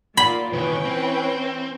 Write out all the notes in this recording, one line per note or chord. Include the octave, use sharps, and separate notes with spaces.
A#2 A#3 F4 D5 B5
C2 D#3 E3 C#4 B4 C#5 G5
C4